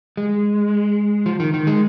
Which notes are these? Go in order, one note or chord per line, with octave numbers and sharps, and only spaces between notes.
G#3
F3
D#3
D#3
G#3